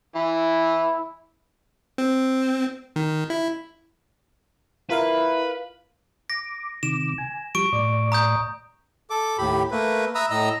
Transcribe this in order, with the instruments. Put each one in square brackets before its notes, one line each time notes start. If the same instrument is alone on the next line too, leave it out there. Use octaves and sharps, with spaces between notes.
[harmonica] E3 [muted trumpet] E4
[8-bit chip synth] C4
D#3
E4
[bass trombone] E4 [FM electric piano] F4 A#4 F5 [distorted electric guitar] B4
[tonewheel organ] D6 [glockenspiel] A#6
[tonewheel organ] C3 D#3 D6 [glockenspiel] E7
[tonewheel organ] G#5
[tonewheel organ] F3 G3 [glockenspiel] C#6 D7
[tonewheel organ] A2 D5
[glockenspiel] A#5 D#6 G6
[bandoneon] A4 D6
D#2 A2 G4 B5
A3 A#3 B4
E5 A#5 B5 D#6 E6 F#6
A2 D#5 A#5 E6